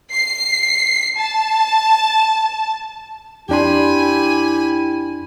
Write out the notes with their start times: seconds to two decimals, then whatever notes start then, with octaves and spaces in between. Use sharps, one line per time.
0.12 C7
1.18 A5
3.49 F2 D4 E4 G4 G#5 B5 C6